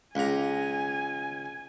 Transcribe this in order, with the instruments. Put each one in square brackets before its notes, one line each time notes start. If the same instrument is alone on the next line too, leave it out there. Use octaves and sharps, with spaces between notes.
[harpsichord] C#2 A#5 [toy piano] G#4 D#5 F5 [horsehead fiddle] G#5